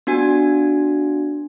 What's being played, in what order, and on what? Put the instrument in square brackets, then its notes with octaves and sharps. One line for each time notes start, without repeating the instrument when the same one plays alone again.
[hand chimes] B3 D4 F#4 G#5